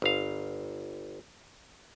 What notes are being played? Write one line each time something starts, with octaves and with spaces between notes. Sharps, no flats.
G1 F5